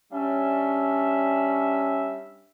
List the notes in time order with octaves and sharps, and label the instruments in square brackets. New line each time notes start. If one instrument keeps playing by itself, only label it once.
[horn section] G3 C#4 D4 E5